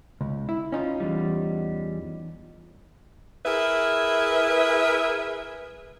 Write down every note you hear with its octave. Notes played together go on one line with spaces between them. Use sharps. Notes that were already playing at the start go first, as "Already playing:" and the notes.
C#2
E4
C#4 D#4 F4
E2 G3
E4 G#4 A#4 B4 E5